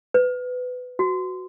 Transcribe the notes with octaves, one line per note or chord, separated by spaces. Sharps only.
B4
F#4